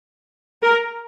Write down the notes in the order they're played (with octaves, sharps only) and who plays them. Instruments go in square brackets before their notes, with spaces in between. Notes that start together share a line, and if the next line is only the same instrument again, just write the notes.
[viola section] A#4